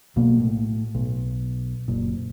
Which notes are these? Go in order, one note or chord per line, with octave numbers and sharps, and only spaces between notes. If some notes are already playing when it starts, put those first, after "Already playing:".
B1 B2 A#3
A2
B1
F#1 A#2